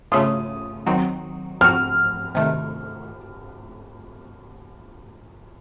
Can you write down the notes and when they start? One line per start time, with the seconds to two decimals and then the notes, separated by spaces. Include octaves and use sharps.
0.12 C#3 A3 C#4 F4 D#6
0.86 D#3 F#3 C4 D#4 F#4
1.61 F3 C4 F#4 F6
2.35 C3 D#3 A3